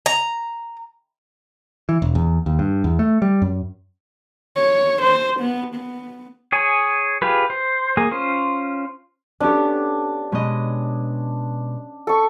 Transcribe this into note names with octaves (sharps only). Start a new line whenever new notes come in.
A#5
E3
E1
E2
D#2
G2
E2
A3
G3
F#2
C#5
C5
B3
B3
G#4 C#5 G#5
F4 G4 G#4 B4
C5
A#3 G#4
C#4 F4 C5
B3 C#4 D4 G4 A4 A5
B2 G#3 C#4 B4 D#5
A4 C#6